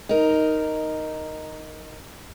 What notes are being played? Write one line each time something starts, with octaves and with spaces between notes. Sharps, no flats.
D#4 A#4